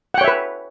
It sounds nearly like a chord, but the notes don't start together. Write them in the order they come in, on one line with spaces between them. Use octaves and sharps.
F#5 G5 C#5 E5 B4